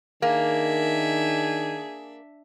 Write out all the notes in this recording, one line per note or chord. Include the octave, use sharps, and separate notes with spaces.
D#3 A#3 D4 G#4 E5